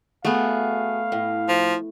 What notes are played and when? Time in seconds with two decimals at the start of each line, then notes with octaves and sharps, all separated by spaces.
0.25 A3 B3 F#4 G#4 F5
1.12 A2
1.49 F3